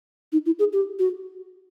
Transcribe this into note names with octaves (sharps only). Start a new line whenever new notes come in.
D#4
E4
G#4
G4
F#4